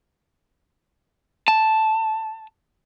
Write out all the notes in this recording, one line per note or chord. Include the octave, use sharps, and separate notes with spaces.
A5